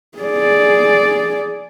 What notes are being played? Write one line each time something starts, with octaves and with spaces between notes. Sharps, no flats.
G#4 D5